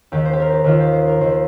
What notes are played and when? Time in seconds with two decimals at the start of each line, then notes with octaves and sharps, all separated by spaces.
0.12 D#2 D#3 G4
0.25 C5
0.33 G4
0.40 A#4
0.53 G4
0.64 D#2 D#3 F4
0.80 G4
0.93 C5
1.07 A#4
1.21 D#2 D#3 C5